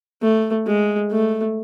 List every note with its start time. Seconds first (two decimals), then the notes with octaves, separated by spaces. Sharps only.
0.22 A3
0.66 G#3
1.11 A3